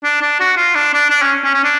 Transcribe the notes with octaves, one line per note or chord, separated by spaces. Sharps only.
D4
D4
F#4
F4
D4
D4
D4
C#4
C#4
C#4
D4